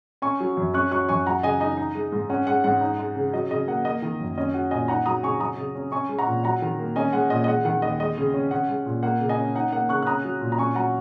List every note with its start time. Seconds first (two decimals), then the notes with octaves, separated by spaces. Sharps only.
0.22 C#4 G#5 C#6
0.40 F#3
0.57 F#2
0.74 C#4 C#6 F#6
0.91 F#3 C#6 F#6
1.09 F#2 G#5 C#6
1.26 F#3 F#5 A#5
1.43 C#3 D#5 G#5
1.60 D#4 D#5
1.77 D#4
1.95 G#3
2.12 G#2
2.30 C#4 F#5
2.47 G#3 F#5
2.64 G#2 F#5
2.81 D#4
2.99 G#3
3.16 C#3
3.33 F#3 D#5
3.51 C#3 D#5
3.67 A#3 F#5
3.85 A#3 D#5
4.02 D#3
4.20 F#2
4.38 C#4 D#5
4.54 F#3 F#5
4.71 A#2 D#5 G#5
4.88 D#4 F#5 A#5
5.06 F#3 A#5 D#6
5.23 C#3 G#5 C#6
5.40 F#3 A#5 D#6
5.57 C#3
5.75 C#4
5.92 C#4 G#5 C#6
6.09 G#3
6.19 F#5 A#5
6.27 A#2
6.44 F#3 F#5 A#5
6.62 D#3
6.79 A#3
6.96 C#4 D#5 G#5
7.13 G#3 F#5
7.30 A#2 D#5
7.44 D#5
7.47 G#3 F#5
7.65 D#3 F#5
7.82 D#2 D#5
8.00 G#3 D#5
8.18 C#3
8.34 C#4
8.51 C#4 F#5
8.69 G#3
8.86 A#2
9.03 A#3 F#5
9.20 C#3
9.29 D#5 G#5
9.38 C#4
9.55 D#4 F#5
9.73 A#3 F#5
9.89 C#3 C#6 F#6
10.03 F#6
10.06 C#4 A#5 D#6
10.25 F#3
10.41 A#2
10.52 A#5
10.58 C#4 G#5 C#6
10.75 F#3 F#5 A#5